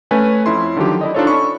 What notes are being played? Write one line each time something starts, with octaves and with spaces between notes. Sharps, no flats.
A3 C#4 B4 G#5
F2 C#4 E4 C6
D3 D#3 F3 F#3 G4
E4 D5 D#5
D4 D#4 F4 A4 C5 C#5
C#4 B5 C#6